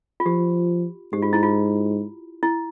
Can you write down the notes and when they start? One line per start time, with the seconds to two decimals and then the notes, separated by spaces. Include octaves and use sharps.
0.20 F4
0.26 F3 G4
1.12 G#2 G4
1.22 F4
1.33 E4
1.43 F4
2.43 E4